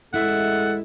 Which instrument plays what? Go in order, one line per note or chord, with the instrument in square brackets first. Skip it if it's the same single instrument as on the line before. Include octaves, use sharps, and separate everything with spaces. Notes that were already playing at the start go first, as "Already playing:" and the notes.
[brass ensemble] A1 G#3 [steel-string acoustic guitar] E4 E5 [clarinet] A4 [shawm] F#5